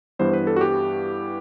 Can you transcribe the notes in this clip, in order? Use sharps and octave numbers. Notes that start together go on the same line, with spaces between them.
G2 E3 G3 B3 C5
B4
A4
F#4
G4